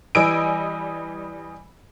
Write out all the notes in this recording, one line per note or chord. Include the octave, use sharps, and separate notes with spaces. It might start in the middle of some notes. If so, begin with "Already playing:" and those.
E3 G3 D#5 G#5 E6 D7